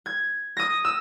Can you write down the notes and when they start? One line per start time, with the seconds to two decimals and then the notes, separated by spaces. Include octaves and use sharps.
0.06 G#6
0.57 D#6 A#6
0.85 E6